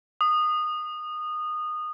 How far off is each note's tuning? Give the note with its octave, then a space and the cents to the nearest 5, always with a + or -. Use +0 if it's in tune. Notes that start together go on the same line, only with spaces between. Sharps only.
D#6 -20